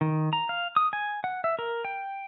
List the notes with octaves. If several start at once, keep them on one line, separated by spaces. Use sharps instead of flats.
D#3
A#5
F5
D#6
G#5
F#5
E5
A#4
G5